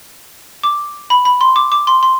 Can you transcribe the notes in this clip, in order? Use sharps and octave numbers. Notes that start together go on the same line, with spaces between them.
D6
B5
B5
C6
D6
D6
C6
C6